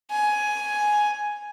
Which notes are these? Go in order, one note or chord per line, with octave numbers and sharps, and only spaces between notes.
G#5